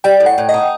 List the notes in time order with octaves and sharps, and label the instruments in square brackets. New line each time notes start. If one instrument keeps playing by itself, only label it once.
[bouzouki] G3 [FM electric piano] G5
[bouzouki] A2
[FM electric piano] F#5
[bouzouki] A2
[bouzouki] D#4 [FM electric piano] D#5